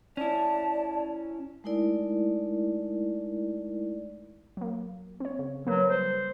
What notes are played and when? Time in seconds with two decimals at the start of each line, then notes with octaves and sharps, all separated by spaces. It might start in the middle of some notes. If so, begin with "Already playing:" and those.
0.17 C#4 E4 D5 A5
1.64 G#3 A3 D#4 E4 A#4 D5
4.57 F#3 A#3
5.20 C4 C#5
5.39 C#3
5.67 F#3 A#3 A#4 B4
5.89 G3 C5